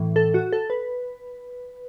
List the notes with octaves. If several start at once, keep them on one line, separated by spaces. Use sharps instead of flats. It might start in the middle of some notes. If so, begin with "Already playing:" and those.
Already playing: A2 E3
A4
F#4
A4
B4